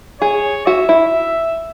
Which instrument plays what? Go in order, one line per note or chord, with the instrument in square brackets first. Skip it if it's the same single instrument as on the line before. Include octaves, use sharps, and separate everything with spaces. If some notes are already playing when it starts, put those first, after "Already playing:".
[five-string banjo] G#4 [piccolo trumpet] C#5
[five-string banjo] F#4 [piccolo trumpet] E5
[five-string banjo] E4